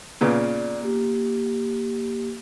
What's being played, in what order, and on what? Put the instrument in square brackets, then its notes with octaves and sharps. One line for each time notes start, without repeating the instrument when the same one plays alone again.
[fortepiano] A#2 C#3 B3 [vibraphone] D5
[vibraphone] A#3 G4